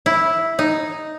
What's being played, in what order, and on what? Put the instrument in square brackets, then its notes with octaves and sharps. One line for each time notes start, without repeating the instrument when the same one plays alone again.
[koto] E4
D#4